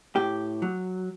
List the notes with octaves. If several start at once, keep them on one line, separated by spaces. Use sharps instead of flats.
A2 G4
F#3